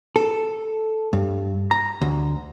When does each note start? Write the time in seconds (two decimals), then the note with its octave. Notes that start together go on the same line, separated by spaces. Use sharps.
0.16 A4
1.13 G2
1.71 A#5
2.01 D2